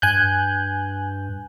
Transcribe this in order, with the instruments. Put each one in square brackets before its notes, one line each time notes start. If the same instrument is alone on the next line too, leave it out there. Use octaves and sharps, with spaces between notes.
[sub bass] G2 [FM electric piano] G#5 F#6 G6